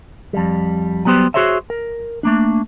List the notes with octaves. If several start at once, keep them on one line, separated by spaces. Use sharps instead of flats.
F2 G3
F#3 G3 B3 G4 C5
F#4 G#4 C5 C#5 E5
A#4
A3 A#3 D4